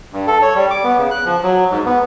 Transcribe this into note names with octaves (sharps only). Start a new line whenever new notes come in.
G2
A4
C#5
G3
D6
B3
C#3
F#6
F3
F#3
G#2
B3